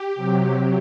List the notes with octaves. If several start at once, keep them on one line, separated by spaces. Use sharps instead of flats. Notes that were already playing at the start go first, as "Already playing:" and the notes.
Already playing: G4
C3 F#3